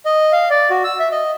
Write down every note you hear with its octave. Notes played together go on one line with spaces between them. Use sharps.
D#5
F5
D5
F#4
E6
E5
D#5